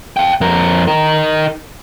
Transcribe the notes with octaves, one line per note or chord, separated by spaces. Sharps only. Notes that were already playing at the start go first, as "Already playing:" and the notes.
F5 G5
F2 A#4
D#4 A#4